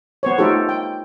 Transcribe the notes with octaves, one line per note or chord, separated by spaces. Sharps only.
B3 C5 C#5
A3 D#4 F4 G4 A4
G5